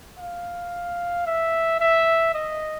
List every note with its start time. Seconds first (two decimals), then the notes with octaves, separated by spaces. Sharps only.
0.19 F5
1.26 E5
1.80 E5
2.34 D#5